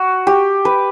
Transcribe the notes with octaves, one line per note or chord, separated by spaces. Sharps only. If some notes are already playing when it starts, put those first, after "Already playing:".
Already playing: F#4
G4
B4